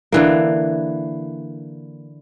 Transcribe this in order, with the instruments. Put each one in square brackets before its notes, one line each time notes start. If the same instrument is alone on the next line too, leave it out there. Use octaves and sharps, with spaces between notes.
[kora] D3 E3 A#3